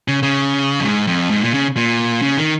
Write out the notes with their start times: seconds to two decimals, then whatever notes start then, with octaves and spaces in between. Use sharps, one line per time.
0.08 C#3
0.23 C#3
0.80 F2
0.84 G#2
1.07 F2
1.30 G#2
1.42 A#2
1.54 C#3
1.77 A#2
2.22 C#3
2.37 D#3